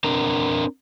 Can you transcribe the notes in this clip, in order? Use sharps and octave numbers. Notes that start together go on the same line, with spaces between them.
C4 D4 A#4